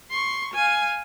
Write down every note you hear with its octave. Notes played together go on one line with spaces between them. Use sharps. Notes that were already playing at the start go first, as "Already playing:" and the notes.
C6 C#6
F5 G#5